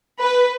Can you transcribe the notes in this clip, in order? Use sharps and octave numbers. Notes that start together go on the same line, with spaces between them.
B4